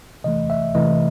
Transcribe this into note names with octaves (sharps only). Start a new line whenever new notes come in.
C3 E3 A3 D#5
E5
C3 E3 A3 D#5